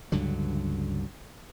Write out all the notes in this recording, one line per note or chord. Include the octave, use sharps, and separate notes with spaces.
C#2 G2 D3 F#3